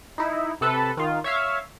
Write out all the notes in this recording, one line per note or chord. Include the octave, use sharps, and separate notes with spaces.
D#4 E4
C3 A4 B4
D#3 F4
C#5 E5 F5